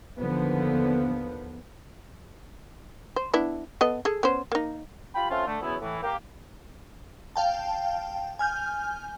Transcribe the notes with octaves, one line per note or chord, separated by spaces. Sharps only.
D#2 D3 F3 B3
C5
B3 D4 E4
B3 A4 D#5
G#4 A4
B3 C#4 C5
A#3 D#4
F4 G4 G5 B5
A3 C4 C#4 F4
D3 A3
E2 C#3 F#3 B3 E4
A2 E3
A#3 G4
F5 G5 A5
G#5 F6 G6